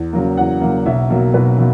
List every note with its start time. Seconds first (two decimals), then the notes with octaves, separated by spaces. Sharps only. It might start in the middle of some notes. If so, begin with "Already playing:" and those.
Already playing: E2
0.13 C#3 F#3 A#3
0.37 E2 F#5
0.61 C#3 F#3 A#3
0.86 B1 E5
1.10 B2 F#3 A#3
1.34 B1 B4
1.58 B2 F#3 A#3